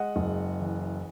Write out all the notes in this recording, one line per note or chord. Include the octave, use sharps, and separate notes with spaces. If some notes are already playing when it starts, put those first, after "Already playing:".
Already playing: G#3 D#5 F#5
F#1
E3